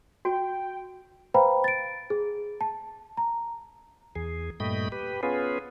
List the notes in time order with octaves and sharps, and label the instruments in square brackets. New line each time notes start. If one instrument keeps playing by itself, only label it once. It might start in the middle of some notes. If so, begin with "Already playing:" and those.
[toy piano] F#4 [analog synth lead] G5
[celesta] B4 C5 F5 G5 A#5 B5
A6 D7
G#4
A5
A#5
[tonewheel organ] E2 G#4
G2 A#2 A3 D#5 G5 B5
G4 B4
B3 C#4 F4 G#4 B4